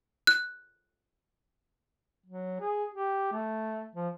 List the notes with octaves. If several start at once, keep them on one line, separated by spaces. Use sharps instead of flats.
F#6
F#3
G#4
G4
A3
F3